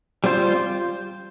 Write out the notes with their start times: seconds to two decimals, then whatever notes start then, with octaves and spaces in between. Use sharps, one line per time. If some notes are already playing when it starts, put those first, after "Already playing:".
0.24 G3 C4 F4 C5